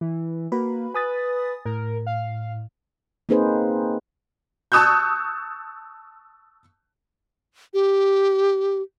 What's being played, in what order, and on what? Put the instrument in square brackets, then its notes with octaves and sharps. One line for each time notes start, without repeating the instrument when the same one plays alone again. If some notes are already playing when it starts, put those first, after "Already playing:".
[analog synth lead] E3
[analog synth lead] A#3 [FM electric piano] F#4 B4 B5
[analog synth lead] B4 [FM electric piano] G#5 D#6 A6
[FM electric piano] A2 [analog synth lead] A#4
[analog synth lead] F5
[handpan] A#3 C4 D#4 G#4 B4 C5
[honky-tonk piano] A5 C#6 D#6 E6 F#6 G6
[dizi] G4